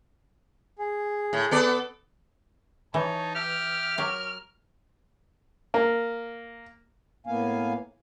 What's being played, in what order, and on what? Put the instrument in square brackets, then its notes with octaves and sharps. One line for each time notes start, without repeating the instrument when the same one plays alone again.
[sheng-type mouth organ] G#4
[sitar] A2
B3 A4 D5
[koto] E3 [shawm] D#4 [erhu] C#5 [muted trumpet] A5
[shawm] G4 [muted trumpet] E5 [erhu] F6
[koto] F#3 G4 [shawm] A#4 [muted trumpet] C#5
[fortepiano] A#3
[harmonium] A2 A#3 B3 F5 G#5